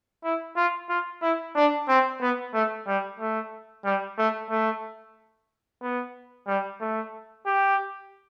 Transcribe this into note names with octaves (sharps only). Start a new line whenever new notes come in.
E4
F4
F4
E4
D4
C4
B3
A3
G3
A3
G3
A3
A3
B3
G3
A3
G4